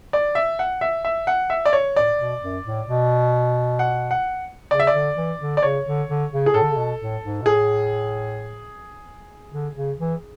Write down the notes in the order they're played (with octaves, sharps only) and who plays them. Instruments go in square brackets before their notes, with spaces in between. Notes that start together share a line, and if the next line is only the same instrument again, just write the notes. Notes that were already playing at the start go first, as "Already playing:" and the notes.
[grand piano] D5
E5
F#5
E5
E5
F#5
E5
D5
C#5
[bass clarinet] A2 [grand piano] D5
[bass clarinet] B2
F#2
A2
B2
[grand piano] F#5
F#5
[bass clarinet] C#3 [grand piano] D5
[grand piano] E5
D5
[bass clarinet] D3
E3
D3
[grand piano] D5
[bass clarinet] C#3 [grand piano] C#5
[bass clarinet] D3
D3
C#3
[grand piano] G#4
[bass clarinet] A2 [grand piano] A4
[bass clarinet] D3
C#3
B2
A2
G#2
B2
[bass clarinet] A2 [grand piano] G#4
[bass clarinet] D3
C#3
E3